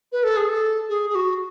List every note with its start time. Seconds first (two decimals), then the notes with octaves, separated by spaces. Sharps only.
0.12 B4
0.24 A4
0.37 G#4
0.49 A4
0.89 G#4
1.10 G#4
1.15 F#4